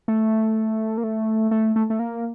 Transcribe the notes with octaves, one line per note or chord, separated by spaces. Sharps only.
A3
A#3
A3
A3
A3
A3
A#3